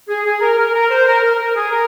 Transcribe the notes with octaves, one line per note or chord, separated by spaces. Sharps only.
G#4
G#4
A#4
A#4
A#4
C5
A#4
A#4
A#4
G#4
A#4